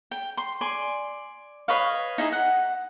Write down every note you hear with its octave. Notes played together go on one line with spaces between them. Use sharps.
G5
C6
D5 G#5 C6
B4 C#5 D#5 F5
D#4 E4 G#4
F#5